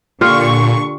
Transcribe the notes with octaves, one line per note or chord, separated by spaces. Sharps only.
A#2 D3 F4 G4 F5 C#6